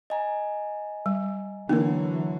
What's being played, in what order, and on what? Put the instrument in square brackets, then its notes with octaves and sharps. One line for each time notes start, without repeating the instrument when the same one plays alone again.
[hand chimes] D#5 G#5 A#5
[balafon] G3
[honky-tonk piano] D3 [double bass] E3 F#3 [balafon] A#3 A#4